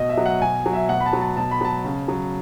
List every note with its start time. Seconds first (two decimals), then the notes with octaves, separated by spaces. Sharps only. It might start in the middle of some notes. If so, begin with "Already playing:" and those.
Already playing: B2 D#5
0.09 E5
0.17 F#3
0.26 F#5
0.42 B2 G#5
0.66 F#3
0.73 E5
0.89 B2 F#5
1.00 B5
1.06 A5
1.13 F#3
1.21 A5
1.37 B2 A5
1.51 B5
1.61 F#3 A5
1.85 C#3
2.08 F#3